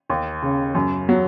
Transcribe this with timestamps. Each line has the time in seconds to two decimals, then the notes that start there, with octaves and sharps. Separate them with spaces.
0.10 D#2
0.43 C#3
0.75 F#2
1.09 F#3